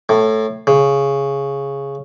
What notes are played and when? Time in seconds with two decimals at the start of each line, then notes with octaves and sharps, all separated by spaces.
0.09 A2
0.67 C#3